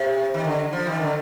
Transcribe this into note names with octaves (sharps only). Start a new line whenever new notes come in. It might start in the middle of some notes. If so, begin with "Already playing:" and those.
Already playing: C3
D#3
D3
F3
D#3
D3